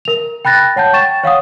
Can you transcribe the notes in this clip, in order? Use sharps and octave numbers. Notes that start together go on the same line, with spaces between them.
A#4 F7
G5 B5 F#6 A6 A#6
C#5 F#5 A5 G6
G5 C#6 A6 E7
C#5 F5 F#5 D#6